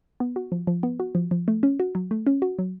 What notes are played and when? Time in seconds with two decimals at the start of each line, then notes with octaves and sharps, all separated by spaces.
0.20 B3
0.36 F#4
0.52 F3
0.67 F3
0.83 B3
1.00 F#4
1.15 F3
1.31 F3
1.48 A3
1.63 C#4
1.80 F#4
1.95 F#3
2.11 A3
2.27 C#4
2.42 F#4
2.59 F#3